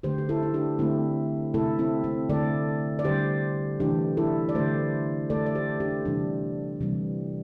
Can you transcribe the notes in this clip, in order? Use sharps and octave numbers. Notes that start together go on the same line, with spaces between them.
D3 A3 G4 C5
G4
E4 A4
E4
D4 G4
D3 A3 C4 E4
C3 A3 E4 A4
C4 E4
C4
D3 A3 A4 D5
D5
D3 G3 G4 C5
C3 E3 A3 D4 G4
E4 A4
D5
D3 A3 G4 C5
D3 A3 A4 D5
D5
G4 C5
D4 G4
C3 E3 G3 D4
C3 E3 G3